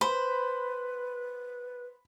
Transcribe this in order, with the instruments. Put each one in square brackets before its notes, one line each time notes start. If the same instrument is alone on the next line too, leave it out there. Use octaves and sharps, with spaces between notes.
[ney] B4 [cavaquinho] C5 [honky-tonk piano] B5